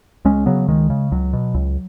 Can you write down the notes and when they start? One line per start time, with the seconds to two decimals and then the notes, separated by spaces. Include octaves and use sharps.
0.25 C#2 G#3 C#4
0.46 C#3 F#3 B3
0.68 C#2 D#3 G#3
0.90 C#3
1.12 C#2 F#3
1.33 B2
1.54 C#2